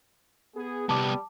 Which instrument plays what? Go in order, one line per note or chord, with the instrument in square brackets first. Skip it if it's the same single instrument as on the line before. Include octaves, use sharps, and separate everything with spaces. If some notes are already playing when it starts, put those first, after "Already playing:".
[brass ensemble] B3 G#4
[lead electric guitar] C2 B3 [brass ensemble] G3 [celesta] A5 D6